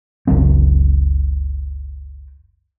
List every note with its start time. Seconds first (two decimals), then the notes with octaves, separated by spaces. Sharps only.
0.27 F#1 C#2 F#3 C4